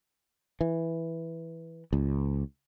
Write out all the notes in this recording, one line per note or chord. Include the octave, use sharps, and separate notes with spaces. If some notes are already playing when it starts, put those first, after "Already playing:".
E3
C#2